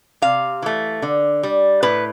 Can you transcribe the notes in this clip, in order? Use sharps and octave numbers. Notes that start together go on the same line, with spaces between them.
C3 F5
E3 A3
D3
G3
A2 B4